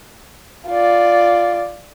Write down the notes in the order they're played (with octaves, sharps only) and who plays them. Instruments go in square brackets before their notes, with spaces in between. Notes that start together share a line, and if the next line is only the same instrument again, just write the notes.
[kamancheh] F4 D5